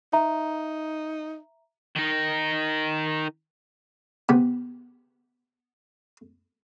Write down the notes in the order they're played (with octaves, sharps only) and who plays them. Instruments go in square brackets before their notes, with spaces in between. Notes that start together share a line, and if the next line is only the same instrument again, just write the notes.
[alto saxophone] D#4 [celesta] E5 A#5
[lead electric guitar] D#3 D#4
[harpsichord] C3 B3